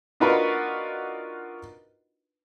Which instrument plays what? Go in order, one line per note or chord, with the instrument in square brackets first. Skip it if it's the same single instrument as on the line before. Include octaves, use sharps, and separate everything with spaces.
[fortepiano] D4 D#4 F4 F#4 A#4 B4